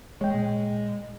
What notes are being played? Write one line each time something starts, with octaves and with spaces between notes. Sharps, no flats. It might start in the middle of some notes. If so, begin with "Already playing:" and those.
G#3 C#5 G5
A#2